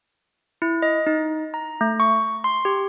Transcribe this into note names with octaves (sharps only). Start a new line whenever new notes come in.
E4
D#5
D#4
A#5
A3
C#6
C6
G4